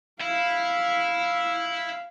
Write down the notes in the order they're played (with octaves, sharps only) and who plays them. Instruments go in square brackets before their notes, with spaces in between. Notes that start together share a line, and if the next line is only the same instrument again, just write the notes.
[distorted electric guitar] E4 [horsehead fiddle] F5